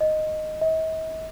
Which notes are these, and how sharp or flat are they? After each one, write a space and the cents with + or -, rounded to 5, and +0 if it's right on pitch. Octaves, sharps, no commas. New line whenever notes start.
D#5 -5
D#5 +45